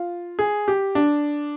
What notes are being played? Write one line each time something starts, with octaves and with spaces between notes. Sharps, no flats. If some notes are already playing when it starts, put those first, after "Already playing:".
Already playing: F4
G#4
G4
D4